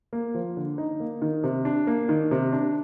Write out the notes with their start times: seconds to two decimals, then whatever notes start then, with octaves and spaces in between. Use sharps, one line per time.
0.13 A#3
0.34 F3
0.57 D3
0.78 D#4
1.00 A#3
1.22 D#3
1.44 C3
1.65 D4
1.87 A#3
2.09 D#3
2.31 C3
2.53 D4